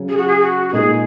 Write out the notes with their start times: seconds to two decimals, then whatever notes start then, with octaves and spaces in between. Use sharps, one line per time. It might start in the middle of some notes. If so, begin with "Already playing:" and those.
Already playing: C#3 F#3 C#4
0.08 G#4
0.17 F#4
0.27 G#4
0.40 F#4
0.69 F#4
0.73 A#2 G#3 D#4 G#4